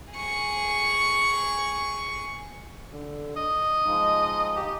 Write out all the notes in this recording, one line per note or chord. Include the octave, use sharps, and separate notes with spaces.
G#4 C#6
D3
D#5
F3 G#3 D#4
G4